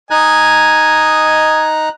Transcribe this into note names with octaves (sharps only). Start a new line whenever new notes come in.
D#4 D#5 G#5 A#5 F#6